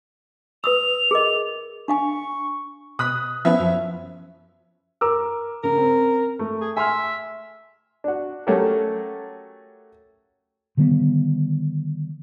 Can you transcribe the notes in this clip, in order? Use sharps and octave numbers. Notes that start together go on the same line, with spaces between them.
B4 D#6 E6 F7
G#4 A#4 D#5
D4 F5 G#5 C#6
B2 B5 D#6 F#6 B6
F3 B3 C#4 E4 E5
F#2 F3
A#4 D6 E6
C#3 A#4
C4
A3
G#4
E5 G#5 C6 F6
D4 F#4
F#3 A3 C#4 G4 A4 A#4
D3 D#3 G3 B3